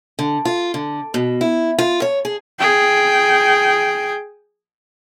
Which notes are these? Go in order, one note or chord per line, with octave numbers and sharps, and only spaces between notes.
D3
F4
D3
B2
E4
F4
C#5
G#4
G#4 G5